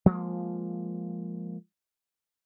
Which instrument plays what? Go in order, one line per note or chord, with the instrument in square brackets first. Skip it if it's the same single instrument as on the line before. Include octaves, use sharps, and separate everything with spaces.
[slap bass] F3 G#3 A#3